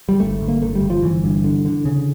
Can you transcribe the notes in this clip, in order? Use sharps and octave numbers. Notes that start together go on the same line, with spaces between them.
G3
G1 A3
G1
A#3
G1 A3
G3
G1
F3
G1 E3
G2
D3
D3
C#3